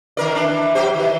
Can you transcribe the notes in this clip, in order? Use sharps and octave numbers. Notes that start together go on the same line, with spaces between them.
D#3 A#4 D5
E3 D4
F#3 G4 C5
D#3 E3